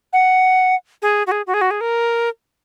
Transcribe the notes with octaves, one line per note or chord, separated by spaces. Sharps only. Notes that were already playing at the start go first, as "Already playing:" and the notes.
F#5
G#4
F#4
G#4
F#4
G#4
F#4
G#4
A#4